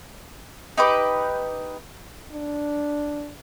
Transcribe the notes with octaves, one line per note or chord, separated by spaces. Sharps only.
D#4 G4 B4 D6
D4